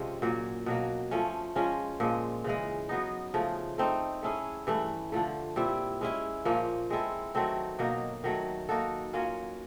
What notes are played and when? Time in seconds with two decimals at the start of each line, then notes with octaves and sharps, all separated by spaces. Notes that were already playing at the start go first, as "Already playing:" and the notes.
Already playing: C3 F3 G#3 C#4
0.22 A#2 F#3 A#3
0.66 B2 F#3 A#3
1.11 F3 A3 C#4
1.55 F3 G#3 C#4 F4
2.00 A#2 F3 G#3
2.44 C#3 E3 G#3
2.89 F#3 B3 D#4
3.34 C#3 F3 A3
3.78 A3 C4 D#4
4.23 A3 C#4 E4 G#4
4.67 G2 E3 A3
5.12 D3 F3 A3
5.56 A#2 G3 C4 E4
6.01 G#3 C#4 E4
6.45 A#2 F3 A#3 C#4
6.90 G#3 C4 E4 A4
7.35 D#3 F#3 A3 C4
7.79 B2 F#3 A#3 D#4
8.24 D#3 F#3 A3
8.69 A#3 D#4 F#4 A4
9.13 F#3 A#3 C#4 F4